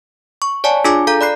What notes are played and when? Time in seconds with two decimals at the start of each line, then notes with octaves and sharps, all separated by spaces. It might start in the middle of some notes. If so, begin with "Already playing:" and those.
0.42 C#6
0.64 C#5 D5 F#5 G#5 A5
0.84 D4 F4 G#4 G#5 D6
1.07 A4 F5 A#5 G6
1.21 D5 B5 F#6 C7